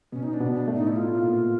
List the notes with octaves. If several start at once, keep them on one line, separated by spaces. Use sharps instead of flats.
B2 B3 C#4
D#4
D4
B2 B3
D4
A2 A3
D#4
E4
F4
A#2 A#3